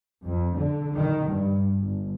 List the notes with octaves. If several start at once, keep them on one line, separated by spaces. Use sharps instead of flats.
F2
D3
D#3
G2
G1